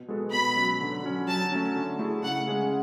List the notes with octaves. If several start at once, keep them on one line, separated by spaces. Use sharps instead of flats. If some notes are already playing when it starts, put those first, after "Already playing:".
Already playing: B2
G#3 B3 F#4 A4
B2 B5
F#3 C#4 F#4
D3
F#3 C#4
F#3 A5
A3 C#4
D3
A3 E4 G#4
C#3 F#5
G#3 C#4 G#4